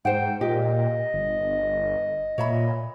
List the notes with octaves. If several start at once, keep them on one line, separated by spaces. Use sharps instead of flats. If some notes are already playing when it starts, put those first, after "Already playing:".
G#2 C5 F#5 G5
A#2 G4 D#5
G1
A#2 C#5 E5 B5